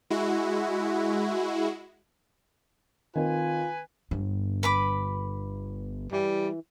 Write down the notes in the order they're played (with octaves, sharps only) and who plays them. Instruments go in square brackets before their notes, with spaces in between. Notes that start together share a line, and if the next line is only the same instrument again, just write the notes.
[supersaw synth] G#3 E4 F#4
[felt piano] D#3 C4 [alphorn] F4 [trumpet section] B4 G#5
[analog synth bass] G1 [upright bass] G2 D4
[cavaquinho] B4 B5 D6
[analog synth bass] E3 [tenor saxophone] G3